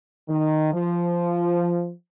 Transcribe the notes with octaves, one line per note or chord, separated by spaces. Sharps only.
D#3
F3